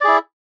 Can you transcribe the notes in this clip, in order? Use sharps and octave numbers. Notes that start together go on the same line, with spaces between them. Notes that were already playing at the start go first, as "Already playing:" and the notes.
E4 G#4 D5